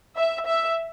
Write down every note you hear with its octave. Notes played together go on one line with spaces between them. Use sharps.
E5
E5